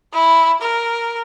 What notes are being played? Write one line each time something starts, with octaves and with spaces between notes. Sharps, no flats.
E4
A#4